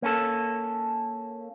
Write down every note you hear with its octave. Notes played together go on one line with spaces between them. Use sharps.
A#3 C#4 A4